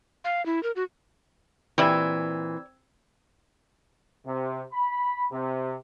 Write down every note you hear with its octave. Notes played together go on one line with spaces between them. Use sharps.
F5
E4
A#4
F#4
A#2 E3 C4 G4 D5 E5 E6 G#6
C3
B5
C3